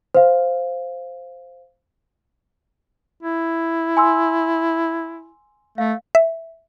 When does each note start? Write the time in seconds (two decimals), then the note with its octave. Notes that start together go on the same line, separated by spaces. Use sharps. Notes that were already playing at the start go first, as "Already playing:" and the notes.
0.15 C5 F5
3.23 E4
3.97 G#5 C6 E6
5.78 A3 F5
6.15 E5